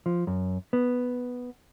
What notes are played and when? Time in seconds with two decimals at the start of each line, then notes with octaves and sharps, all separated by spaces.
0.06 F3
0.27 F#2
0.73 B3